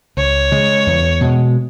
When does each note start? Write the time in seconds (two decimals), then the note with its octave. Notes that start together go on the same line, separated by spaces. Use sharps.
0.17 C#2 C#5
0.52 C#3 G#3
0.86 E2
1.21 B2 G#3